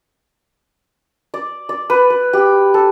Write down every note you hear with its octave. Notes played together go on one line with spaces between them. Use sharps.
D5
D5
B4
B4
G4
A4